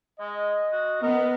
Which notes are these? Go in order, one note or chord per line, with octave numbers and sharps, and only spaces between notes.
G#3 D#5
F#4
B3 A#4 D#5